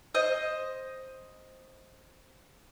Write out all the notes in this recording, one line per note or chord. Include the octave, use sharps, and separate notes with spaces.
C5 D#5